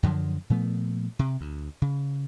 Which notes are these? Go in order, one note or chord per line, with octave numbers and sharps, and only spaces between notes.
F#2 D3 F3 F#3
A#2 F3 A3 B3
C3
D2
C#3